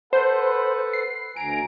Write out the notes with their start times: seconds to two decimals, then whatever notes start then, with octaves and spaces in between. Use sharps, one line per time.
0.13 A4 B4 C5 F#5
0.93 C7
1.36 D2 G#5 A#5 D7